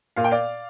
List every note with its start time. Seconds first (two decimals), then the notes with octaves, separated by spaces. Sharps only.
0.16 A#2 F5
0.24 G5
0.31 D5 F5